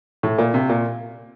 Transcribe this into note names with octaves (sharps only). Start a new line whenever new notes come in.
A2
A#2
C3
A#2